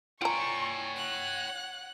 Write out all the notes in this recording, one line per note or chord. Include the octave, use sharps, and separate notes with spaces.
F4 C#5 D5 G5 G#5 A#5 C#6
F#5 F#6